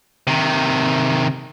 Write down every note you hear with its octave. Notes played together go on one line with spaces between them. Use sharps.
C3 D#3